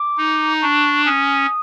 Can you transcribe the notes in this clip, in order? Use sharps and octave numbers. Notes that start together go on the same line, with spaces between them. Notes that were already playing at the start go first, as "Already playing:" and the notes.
Already playing: D6
D#4
D4 C#6
C#4 D#6